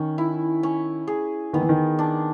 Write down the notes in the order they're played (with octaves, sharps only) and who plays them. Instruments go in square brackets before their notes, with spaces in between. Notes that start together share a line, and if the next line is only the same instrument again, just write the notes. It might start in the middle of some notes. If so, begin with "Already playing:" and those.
Already playing: [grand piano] D#3 [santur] C#4
[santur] E4
C#4
G#4
[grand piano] D#3 [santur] B3
[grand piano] E3
D#3
[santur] D4